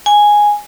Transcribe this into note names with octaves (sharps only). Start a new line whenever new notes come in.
G#5